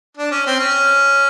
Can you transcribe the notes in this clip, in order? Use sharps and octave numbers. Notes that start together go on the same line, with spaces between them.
D4
C#4
C4
C#4